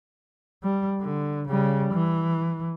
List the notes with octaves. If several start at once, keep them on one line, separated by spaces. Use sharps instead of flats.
G3
D3
C#3 G3
E3